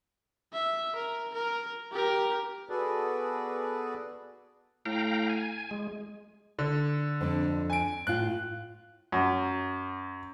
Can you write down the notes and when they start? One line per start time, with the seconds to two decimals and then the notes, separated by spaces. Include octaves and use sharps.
0.53 E5
0.96 A#4
1.34 A#4
1.92 G4 A#4
2.69 B3 F#4 G#4 A4 B4 D5
4.86 A2 F5 G5 A#5
5.30 G#5
5.71 G#3
6.59 D3
7.21 F2 D4
7.70 G#5 D7
8.07 A2 F4 F#6
9.12 F#2